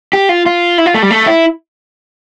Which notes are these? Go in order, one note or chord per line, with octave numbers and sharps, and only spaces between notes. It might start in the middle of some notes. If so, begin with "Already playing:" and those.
G4
F4
F4
E4
F4
A3
G3
A3
E4